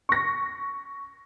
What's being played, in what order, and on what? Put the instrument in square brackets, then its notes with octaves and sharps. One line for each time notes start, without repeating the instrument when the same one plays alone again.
[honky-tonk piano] C#6 A#6